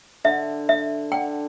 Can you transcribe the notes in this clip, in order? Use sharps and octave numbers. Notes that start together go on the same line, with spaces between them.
D3 E5
E5
D3 G5